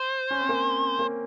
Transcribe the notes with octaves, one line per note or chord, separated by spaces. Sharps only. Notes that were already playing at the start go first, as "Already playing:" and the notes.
Already playing: C5
C#4
C4
A#3 C#4
A#3 C#4